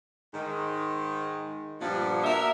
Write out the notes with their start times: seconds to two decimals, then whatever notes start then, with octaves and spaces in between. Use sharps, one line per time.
0.34 G#2 D#3
1.81 G2 A#2 F3 B3 D4
2.24 F#4 A#4 E5